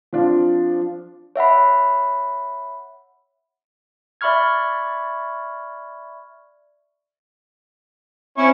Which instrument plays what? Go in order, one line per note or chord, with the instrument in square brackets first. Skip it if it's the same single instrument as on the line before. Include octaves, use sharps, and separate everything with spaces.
[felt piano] F3 C4 D4 F4
[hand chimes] C#5 E5 F#5 B5
[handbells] D5 E5 B5 C#6 F6 G#6
[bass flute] C4 [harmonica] C#4 E4 C#6